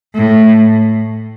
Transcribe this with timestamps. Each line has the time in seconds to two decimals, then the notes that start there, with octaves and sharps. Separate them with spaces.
0.15 A2